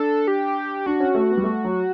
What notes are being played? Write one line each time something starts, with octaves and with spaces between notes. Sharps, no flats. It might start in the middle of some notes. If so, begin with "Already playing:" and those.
Already playing: D4 A4
G4
D4 F#4
C#4
A3
B3
G3
A3
F#3